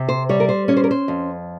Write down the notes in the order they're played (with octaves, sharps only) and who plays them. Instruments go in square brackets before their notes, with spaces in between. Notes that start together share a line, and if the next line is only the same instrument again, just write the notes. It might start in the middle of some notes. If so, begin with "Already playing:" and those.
Already playing: [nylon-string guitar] C3
C5
G3 C#5
A#4
C5
C#4 C#5
C5
A#4
C5
F2